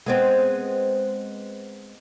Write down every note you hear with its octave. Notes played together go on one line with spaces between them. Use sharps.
G#3 B3 C4